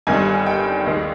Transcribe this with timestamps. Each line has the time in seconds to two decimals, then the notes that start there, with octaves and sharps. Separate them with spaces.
0.07 G1 G2 D#3 G3 G#5
0.46 G5
0.86 D#2 D#3 G#3